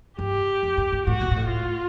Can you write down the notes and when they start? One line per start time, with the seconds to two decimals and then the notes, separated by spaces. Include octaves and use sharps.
0.19 G2 G4
0.63 F2
0.77 F#2
0.92 G2
1.06 A2 F#4
1.21 A#2
1.31 A#2
1.36 A2
1.51 F4